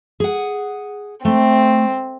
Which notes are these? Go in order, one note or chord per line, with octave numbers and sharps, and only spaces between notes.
G#4 F#5
A3 C4